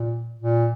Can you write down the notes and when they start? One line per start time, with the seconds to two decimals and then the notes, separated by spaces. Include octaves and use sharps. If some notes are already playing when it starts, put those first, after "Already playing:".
Already playing: A#2
0.39 A#2